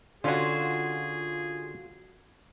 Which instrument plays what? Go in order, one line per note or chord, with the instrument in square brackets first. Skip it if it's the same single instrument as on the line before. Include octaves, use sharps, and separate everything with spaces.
[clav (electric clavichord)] D3 C#4 [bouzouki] F4 F#4 [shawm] G#4